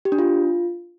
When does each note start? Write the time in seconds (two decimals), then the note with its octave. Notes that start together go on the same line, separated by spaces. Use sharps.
0.05 G4
0.12 D4
0.19 F4